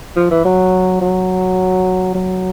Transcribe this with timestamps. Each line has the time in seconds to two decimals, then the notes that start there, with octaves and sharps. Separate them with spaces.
0.16 F3
0.31 E3
0.45 F#3
1.01 F#3
2.15 F#3